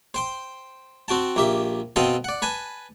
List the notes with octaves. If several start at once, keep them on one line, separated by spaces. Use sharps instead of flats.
C5 G5 C6
C4 F#4 G5 A5
A#1 A#3 G4 E5
B2 C4 A4 F5 G5 D#6
D5 F#5
B4 G#5 A5